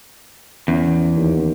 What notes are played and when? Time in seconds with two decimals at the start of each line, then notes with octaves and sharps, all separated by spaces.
0.68 E2 C#4
1.16 D#2